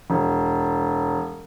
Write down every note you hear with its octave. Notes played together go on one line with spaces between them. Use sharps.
E1